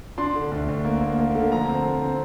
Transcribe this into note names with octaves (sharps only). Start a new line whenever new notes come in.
D4 C6
D3
D2
D2
A#3
A#3
A#3
D3
F3 A#5
C4
C4
C4